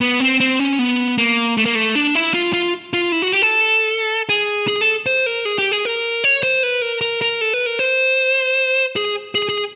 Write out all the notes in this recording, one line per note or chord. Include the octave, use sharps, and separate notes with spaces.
B3
C4
C4
C#4
B3
A#3
A3
A#3
A3
D4
E4
F4
F4
F4
E4
F#4
G4
A4
G#4
G#4
A4
C5
A#4
G#4
G4
G#4
A#4
C#5
C5
B4
A#4
A#4
A#4
A4
B4
A#4
C5
G#4
G#4
G#4